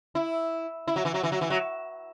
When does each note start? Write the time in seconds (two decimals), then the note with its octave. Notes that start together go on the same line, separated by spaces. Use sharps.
0.15 E4
0.88 E4
0.96 F#3
1.05 E3
1.14 F#3
1.23 E3
1.32 F#3
1.41 E3
1.50 F#3